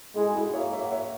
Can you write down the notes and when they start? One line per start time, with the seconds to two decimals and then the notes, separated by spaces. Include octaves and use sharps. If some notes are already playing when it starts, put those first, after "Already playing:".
0.15 G#3 E4 G#4
0.26 F#4
0.35 E4 G#4
0.44 F#4
0.54 A#3 C#5 E5
0.73 C#5 E5
0.84 F#5
0.92 C#5 E5